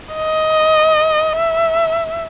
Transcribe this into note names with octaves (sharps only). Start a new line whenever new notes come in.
D#5
E5